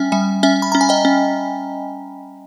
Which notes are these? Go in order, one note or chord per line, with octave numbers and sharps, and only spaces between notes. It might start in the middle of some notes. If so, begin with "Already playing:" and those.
Already playing: G3 C#4 E5 G5 G#5
G3 E5 G#5
C#4 E5 G#5
B5
C#4 A#5
G#5
D#5 G5
C#4